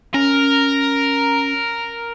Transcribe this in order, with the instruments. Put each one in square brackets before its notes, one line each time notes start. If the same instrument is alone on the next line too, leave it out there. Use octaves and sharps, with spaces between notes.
[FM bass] C#4 [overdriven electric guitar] A#4